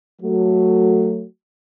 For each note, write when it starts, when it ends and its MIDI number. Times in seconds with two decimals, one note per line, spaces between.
0.22 1.25 54
0.22 1.25 57
0.22 1.25 66